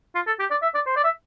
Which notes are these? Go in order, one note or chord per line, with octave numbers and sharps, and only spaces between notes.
F4
A4
G4
D5
E5
D5
C5
D5
E5